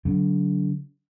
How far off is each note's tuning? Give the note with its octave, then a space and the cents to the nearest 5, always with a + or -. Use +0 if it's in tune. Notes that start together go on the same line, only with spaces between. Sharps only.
D3 -25 F#3 +10